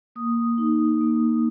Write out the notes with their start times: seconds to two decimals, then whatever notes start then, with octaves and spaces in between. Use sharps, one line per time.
0.16 A#3 D#6
0.58 D#4
1.01 A#3